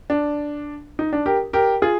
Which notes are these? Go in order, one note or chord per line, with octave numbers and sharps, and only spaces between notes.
D4
D#4
D4
G4 A#4
G4 A#4
F4 G#4